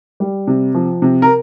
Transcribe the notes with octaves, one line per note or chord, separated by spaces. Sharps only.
G3
C3
F3
C3
A#4